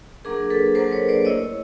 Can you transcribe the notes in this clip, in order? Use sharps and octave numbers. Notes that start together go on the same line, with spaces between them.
F#3 A#3 D4 G#4 A#4
A4 B4
F#3 A#3 D4 A#4 C5
B4 C#5
C5 D5
A3 C#4 E4 C#5 D#5